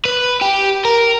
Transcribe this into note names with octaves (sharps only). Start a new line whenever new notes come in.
B4
G4
A#4